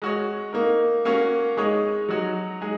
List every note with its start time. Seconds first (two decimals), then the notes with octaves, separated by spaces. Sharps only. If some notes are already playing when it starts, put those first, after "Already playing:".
0.02 G#3 F#4 C#5
0.53 A#3 D#4 A#4
1.05 A#3 C#4 F#4 C#5
1.57 G#3 D#4 G#4 C#5
2.09 F#3 D#4 F#4 C#5
2.61 G#3 D#4 G#4